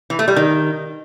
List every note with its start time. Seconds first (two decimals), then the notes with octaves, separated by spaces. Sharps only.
0.10 E3
0.19 A3
0.28 G3
0.36 D#3